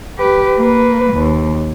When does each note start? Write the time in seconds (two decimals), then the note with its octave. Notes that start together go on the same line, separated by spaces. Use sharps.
0.19 G4 B4
0.58 A#3 B4
1.14 D#2